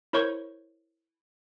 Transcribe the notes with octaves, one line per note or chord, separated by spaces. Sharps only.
E4 A#4 C5 C#5 C#6